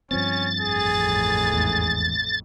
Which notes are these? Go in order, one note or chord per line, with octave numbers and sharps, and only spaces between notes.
G2 F3 C4 C#4 A6
A1 F2 G#4
E2 G#2